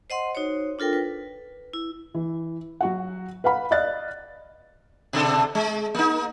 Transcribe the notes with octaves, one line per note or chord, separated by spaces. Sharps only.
C5 D#5 F#5 C6
D#4 F#4 C5 C#5
D4 F4 A4 A#4 G5
B4
E4
E3
F#3 F#4 F#5
B4 F5 F#5 B5
D5 D#5 F5 F#6 A6
B2 D3 A4
G#3
A#3 D#4